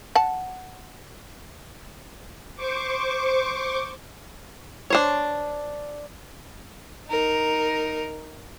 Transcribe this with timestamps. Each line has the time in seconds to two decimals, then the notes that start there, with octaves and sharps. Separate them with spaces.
0.15 F#5 A5
2.56 C5 C#6 D6
4.90 D4 C5 C#5
7.08 D#4 A#4